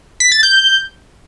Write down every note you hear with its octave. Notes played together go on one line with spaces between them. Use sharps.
B6
A6
G6